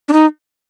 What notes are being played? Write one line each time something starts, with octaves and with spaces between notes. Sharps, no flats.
D4
D#4